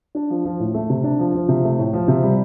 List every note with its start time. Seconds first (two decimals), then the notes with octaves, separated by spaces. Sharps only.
0.15 D4
0.30 F3
0.45 F3
0.60 A2
0.74 A3
0.90 C3
1.04 D4
1.19 F3
1.34 F3
1.48 C3
1.64 A3
1.79 A2
1.93 F3
2.08 C3
2.23 G3